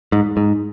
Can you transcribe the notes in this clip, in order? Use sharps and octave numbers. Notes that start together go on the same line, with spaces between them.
G#2
G#2